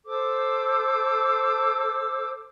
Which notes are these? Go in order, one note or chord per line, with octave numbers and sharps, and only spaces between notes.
A4 C5 D6 E6